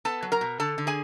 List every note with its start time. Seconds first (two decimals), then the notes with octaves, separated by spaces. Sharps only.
0.05 B3 A4 A5
0.22 F#3
0.32 A#4 A#5
0.41 B2
0.60 D3 A4 A5
0.78 D3
0.87 G#4 G#5